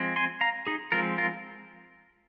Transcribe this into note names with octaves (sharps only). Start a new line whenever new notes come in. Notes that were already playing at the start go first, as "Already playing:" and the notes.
Already playing: F3 G#3 C4
G#5 C6
F5 A#5
D#4 G#4
F3 G#3 C4 F4 A#4
F4 A#4